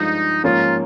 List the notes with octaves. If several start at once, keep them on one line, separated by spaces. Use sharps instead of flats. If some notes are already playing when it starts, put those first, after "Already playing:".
Already playing: G2 F3 G#3 D#4
G#2 F3 A#3 C#4 F4